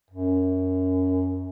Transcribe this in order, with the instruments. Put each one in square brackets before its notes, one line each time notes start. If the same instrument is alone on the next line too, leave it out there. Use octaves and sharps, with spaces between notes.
[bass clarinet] F#2